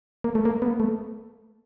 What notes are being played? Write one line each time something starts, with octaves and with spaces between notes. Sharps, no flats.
A#3
A3
A#3
B3
A#3
A3